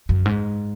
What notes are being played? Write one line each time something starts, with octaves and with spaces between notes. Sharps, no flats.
F#2
G#2